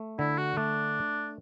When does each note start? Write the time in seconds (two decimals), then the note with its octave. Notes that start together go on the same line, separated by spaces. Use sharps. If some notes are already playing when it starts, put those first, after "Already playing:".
Already playing: A3
0.19 D3 E4
0.38 F#4
0.57 A3 D4